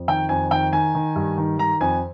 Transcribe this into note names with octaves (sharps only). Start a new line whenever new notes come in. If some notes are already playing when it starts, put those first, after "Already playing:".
Already playing: F2
D#3 G5
F2 G#5
D#3 G5
D#3 G#5
D#3
G2
D#3
D#3 A#5
F2 G#5